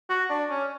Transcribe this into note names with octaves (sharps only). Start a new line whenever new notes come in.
F#4
D4
C#4